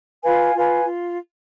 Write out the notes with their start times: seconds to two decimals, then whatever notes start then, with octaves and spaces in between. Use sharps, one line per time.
0.23 F4 B4 F5 G#5
0.54 F4 B4 F5 G#5
0.85 F4